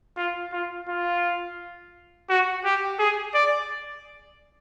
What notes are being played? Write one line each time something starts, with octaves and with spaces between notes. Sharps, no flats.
F4
F4
F4
F#4
G4
G#4
D5